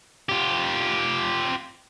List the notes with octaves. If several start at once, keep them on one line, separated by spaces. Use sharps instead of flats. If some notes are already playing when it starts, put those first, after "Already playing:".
F4 G4